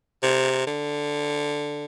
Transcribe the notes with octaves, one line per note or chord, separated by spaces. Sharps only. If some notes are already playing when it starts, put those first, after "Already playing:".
C3
D3